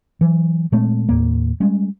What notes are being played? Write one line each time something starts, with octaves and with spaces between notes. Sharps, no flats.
E3 F#3
A#2 G#3 A3 C4
D#2 A2 A#3
G3 G#3 C#4